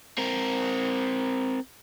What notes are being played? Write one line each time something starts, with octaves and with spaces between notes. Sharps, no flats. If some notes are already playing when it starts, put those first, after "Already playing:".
C4 A#4